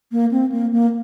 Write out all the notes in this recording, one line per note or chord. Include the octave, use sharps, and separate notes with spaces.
A#3
C4
A#3
A#3